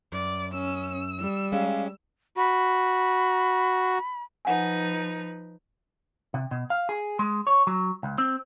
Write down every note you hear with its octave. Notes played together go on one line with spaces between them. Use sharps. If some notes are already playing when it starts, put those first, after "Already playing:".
F#2 D5
C#4 E6
G3
G#3 C#4 G4 F5
F#4 B5
F3 D#4 B4 F#5 G#5
C3
B2
F5
G#4
G#3
C#5
F#3
C#2
C4